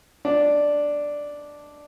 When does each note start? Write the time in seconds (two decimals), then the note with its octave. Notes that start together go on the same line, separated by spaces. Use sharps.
0.25 D4